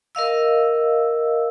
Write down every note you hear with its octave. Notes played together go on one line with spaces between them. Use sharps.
A#4 D#5 F5 E6